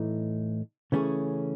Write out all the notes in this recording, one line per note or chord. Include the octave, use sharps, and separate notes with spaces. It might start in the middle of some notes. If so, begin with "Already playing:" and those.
Already playing: A2 E3 A3 D#4
C#3 E3 A3 C#4 G#4